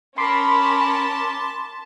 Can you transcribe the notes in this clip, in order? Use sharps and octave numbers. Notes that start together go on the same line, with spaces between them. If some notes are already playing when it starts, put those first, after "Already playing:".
C#4 A#4 A5 B5 C6 D6 B6